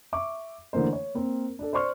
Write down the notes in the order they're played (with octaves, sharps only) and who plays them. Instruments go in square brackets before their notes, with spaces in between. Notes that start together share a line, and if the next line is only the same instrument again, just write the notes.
[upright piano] E5 C#6 D6
D3 E3 A3 A#3 C5
C#5
A#3 C4 A#4
D4 A4
C5 D5 C6 C#6 F6